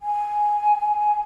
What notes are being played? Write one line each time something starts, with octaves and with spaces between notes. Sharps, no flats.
G#5